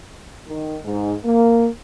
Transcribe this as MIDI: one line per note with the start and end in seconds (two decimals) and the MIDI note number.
0.46 0.77 51
0.83 1.13 44
1.24 1.68 58